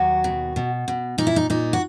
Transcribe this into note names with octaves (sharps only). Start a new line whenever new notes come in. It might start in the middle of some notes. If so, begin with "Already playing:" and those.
Already playing: D#2 F#3 F#4
B2
B2
B2
A#2 D#4
E4
D#4
A#2 D#4
F#4